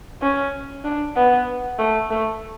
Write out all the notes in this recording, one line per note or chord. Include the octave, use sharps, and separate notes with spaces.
C#4
D4
B3
A3
A3